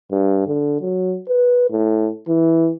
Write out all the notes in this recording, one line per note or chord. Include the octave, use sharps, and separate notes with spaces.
G2
D3
F#3
B4
A2
E3